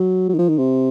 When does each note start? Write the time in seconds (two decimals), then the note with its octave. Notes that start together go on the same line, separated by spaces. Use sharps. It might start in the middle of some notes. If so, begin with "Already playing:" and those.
Already playing: F#3
0.29 F#3
0.34 D#3
0.39 F3
0.49 D#3
0.59 C3